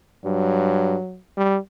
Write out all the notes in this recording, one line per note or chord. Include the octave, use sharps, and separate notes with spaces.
G2 F#3
G3